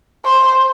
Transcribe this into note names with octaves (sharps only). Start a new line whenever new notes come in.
C5